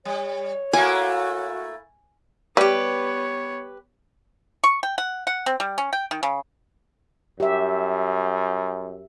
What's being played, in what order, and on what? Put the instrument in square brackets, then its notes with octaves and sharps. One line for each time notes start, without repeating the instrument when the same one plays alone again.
[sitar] G3 [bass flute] C#5
[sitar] A3 A#3 E4 [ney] F#4 [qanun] G#5
[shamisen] G3 [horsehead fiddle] B3 C#5 [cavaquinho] G4 B4
[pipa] C#6
G5
F#5
F#5
C4
G3
C#4
G5
D#3
C#3
[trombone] F#2 [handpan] G4 E5